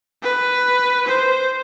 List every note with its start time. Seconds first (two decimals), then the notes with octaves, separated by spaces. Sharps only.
0.23 B4
1.07 C5